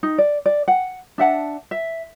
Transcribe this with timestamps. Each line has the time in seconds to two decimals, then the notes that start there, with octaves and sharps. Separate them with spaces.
0.03 D#4
0.18 D5
0.46 D5
0.68 F#5
1.18 D4 E5 F#5 A5
1.71 E5